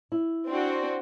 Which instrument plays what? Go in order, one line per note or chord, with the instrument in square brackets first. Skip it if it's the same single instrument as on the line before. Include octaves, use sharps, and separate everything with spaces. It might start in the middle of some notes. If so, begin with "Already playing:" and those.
[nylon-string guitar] E4
[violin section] C4 D4 F#4